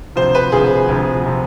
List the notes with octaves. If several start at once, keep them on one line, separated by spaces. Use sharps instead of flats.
D2 C3 F3 C5
B4
D2 C3 F3 G#4
D2 C3 F3
C3 F3